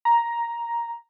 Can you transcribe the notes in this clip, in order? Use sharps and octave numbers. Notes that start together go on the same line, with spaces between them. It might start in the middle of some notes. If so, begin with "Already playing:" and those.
A#5